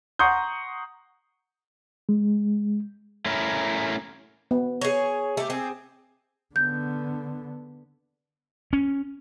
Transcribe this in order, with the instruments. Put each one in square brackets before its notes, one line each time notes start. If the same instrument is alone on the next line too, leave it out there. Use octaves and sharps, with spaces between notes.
[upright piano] F#5 A#5 C6 C#6 D#6 G6
[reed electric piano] G#3
[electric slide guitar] A3 C#4 E4 A#4
[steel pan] B3
[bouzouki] G#4 C#5
A3 G4
C4 G#4
[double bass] D3 B3 [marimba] G6
[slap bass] C#4